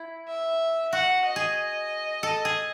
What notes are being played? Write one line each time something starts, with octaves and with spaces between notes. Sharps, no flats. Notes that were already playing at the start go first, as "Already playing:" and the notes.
Already playing: E4
E5
F#4 F#5
D#5
G#4
A4
G#4